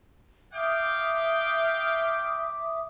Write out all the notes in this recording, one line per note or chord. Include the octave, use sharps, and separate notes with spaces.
E5 F5 G5 D6 D#6